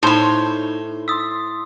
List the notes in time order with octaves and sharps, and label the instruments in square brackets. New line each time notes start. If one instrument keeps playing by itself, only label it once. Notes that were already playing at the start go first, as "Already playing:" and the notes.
[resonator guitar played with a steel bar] A2 [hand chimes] D#4 [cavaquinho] C5 C#5
[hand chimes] C6 A6 B6 [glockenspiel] D#6 E6